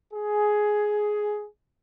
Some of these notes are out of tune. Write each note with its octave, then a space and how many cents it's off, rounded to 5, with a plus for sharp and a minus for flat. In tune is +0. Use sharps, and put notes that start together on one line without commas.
G#4 +10